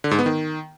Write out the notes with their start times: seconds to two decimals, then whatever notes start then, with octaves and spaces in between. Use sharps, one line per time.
0.04 D3
0.11 G#2
0.19 B3
0.26 D#3